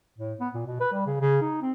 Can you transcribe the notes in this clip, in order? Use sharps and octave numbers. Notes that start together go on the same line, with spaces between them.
A2
B3
A#2
B2
B4
G3
C#3
C#3
D#4
C4